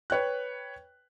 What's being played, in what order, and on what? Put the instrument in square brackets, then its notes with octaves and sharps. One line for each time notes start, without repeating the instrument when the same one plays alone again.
[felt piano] B4 C#5 G5 F#6